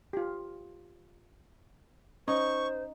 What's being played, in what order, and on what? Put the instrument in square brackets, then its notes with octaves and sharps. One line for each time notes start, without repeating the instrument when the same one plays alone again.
[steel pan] F4 G4
[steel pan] C#4 [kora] D#4 [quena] C5 [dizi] C#6